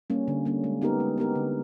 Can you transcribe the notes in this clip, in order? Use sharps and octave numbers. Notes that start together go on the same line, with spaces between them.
G3 A#3 C#4
D3
G3 A#3 C#4
G#3
B3 D#4 G4 A#4
G#3
B3 D#4 G4 A#4
D3